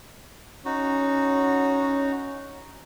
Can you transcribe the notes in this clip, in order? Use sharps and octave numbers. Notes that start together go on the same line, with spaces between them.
C#4 D#4 F#4